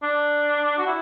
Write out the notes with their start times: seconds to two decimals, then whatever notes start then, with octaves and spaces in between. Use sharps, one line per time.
0.03 D4
0.78 F#4
0.87 E4